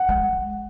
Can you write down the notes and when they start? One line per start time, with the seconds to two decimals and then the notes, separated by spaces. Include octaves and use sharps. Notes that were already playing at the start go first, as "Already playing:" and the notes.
Already playing: F#5
0.09 G#3